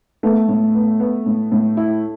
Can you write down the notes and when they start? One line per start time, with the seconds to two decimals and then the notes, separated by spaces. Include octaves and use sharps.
0.23 A3 B3
0.49 A2
0.75 B3
1.00 B3
1.26 A2
1.52 A2
1.77 E4